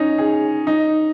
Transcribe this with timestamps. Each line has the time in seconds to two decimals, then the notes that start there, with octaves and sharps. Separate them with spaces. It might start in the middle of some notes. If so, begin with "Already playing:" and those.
Already playing: C#4 D#4
0.18 G#4
0.67 D#4